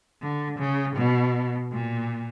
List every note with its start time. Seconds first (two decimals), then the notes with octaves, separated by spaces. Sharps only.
0.22 D3
0.59 C#3
0.96 B2
1.72 A#2